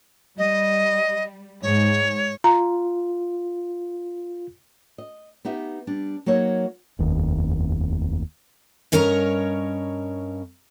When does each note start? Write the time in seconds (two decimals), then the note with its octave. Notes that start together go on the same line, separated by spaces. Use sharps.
0.38 G3 D#5
1.62 G#2 C#5
2.44 F4 A#5
4.98 D#5
5.45 B3 D#4 G4 E5
5.87 G3 D4
6.26 F#3 A#3 D#4 C#5
6.99 F1 D#2
8.92 G2 C#4 A#4 C#5 D#5 A#5